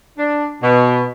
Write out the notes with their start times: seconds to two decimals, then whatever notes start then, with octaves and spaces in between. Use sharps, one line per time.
0.17 D4
0.62 B2